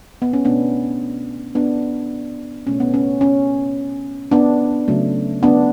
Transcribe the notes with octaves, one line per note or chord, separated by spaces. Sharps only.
B3
C#4
B2 A3 B3 D4
B3 D4
B2 A3 C#4
B3
C#4
C#4
B3 D4
C#3 F#3 A3
B3 D4